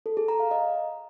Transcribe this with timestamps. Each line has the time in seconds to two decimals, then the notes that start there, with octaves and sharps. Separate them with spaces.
0.06 A4
0.17 G#4
0.28 A#5
0.40 F5
0.51 D#5